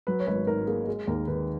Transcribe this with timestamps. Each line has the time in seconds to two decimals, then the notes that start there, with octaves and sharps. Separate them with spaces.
0.07 F#3 B4
0.20 C#5
0.27 G#1 B4
0.47 G#2 A#4
0.67 A#3 G#4
0.88 G#3
1.07 D#2 A#4
1.27 D#3 B4